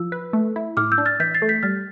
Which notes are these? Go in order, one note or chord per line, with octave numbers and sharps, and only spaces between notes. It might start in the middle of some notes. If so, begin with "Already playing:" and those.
Already playing: F3 E6
B4
A3
E4
A2 D6 F6
E6 G6
D4
F6 A6
E3 G6 B6
A6 C7
A3
G6 B6
G3 F6 A6